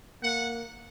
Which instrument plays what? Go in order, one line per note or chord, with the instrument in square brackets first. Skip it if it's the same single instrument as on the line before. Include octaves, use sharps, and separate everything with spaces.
[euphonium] A#3 [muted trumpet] F#5